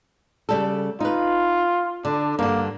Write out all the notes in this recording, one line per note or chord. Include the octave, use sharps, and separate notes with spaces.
C#3 G3 A4
D#4 F4 B4
D3 D4
G2 D3 A#3